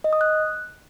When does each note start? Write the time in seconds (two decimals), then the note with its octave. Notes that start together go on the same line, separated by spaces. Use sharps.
0.04 D#5
0.13 D#6
0.21 F#6